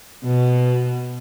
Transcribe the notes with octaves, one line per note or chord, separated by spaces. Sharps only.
B2